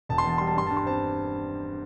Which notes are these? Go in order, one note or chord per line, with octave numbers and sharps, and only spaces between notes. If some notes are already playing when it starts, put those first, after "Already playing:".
E1 A5
C6
E2 A5
G3 C6
A5
G2 C6
G2 A5
C6
C4 A5